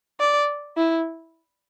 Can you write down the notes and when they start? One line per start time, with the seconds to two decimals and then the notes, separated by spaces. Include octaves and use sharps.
0.20 D5
0.77 E4